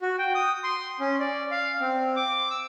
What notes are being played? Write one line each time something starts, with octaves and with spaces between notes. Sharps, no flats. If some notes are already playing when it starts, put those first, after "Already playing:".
F#4
G5
D#6
C6
C#4
D5
F5
C4
D6
E6